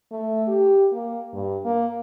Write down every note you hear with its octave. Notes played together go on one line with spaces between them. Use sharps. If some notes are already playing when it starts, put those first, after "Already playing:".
A3
G4
A#3
G2
A#3